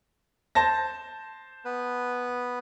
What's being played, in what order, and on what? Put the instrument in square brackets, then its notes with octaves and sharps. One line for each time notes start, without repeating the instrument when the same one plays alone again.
[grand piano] C5 A5 A#6
[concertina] B3 B4